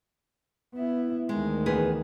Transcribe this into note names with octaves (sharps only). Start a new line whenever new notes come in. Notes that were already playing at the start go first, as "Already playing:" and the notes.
B3 E4
D2 D#3 G#3
E2 G#4 B4